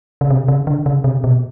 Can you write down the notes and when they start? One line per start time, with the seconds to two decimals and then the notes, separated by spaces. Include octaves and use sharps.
0.21 C#3
0.30 C3
0.48 C#3
0.67 D3
0.86 C#3
1.04 C3
1.24 B2